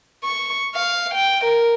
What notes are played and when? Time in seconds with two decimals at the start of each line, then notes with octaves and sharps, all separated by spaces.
0.24 C#6
0.75 F5
1.14 G5
1.44 A#4